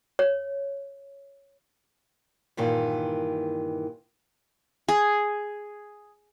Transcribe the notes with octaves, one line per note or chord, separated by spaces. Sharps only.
C#5
G2 A#2 D#3 E3
G#4